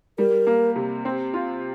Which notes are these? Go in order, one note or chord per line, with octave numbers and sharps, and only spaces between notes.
G3 A#4
A#3
C3
C4
F4